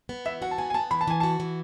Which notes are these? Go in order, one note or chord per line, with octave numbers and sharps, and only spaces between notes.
B3
E3 E5
F#4 F#5
A5
B3 G#5
G#5
B3 A5
E3 B5
A5
E3 G#5
F#4 A5
E3